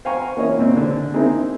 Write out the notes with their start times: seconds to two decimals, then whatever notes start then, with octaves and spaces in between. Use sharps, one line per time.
0.05 C5 F5 G5 G#5 A#5 C#6
0.37 A#3 C#4 E4 C#5 D#5
0.58 A#2 C4
0.77 D3
1.14 A#3 C4 D#4 E4 G#4